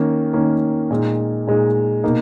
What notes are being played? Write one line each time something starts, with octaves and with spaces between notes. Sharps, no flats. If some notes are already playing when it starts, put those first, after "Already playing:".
Already playing: D#3 A#3 C#4
D#3 A#3 C#4
A#2 G#3 D#4
A#2 G#3 D#4
B2 A#3 D#4